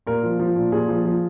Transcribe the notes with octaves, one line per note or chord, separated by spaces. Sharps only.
A#2 A#4
F3
F3
A#2
A#2 G#4
F3
F3